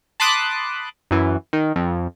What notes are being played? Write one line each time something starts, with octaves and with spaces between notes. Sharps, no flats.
A5 B5 C6 D6 D#6 F#6
F#2 E3
D#3
F2